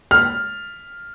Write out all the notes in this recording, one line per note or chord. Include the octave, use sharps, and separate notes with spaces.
F6